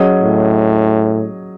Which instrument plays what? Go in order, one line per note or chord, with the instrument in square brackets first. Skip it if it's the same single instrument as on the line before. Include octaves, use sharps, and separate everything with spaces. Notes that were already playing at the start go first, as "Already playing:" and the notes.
Already playing: [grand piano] F#3 C#4 G#4 D#5
[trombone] A2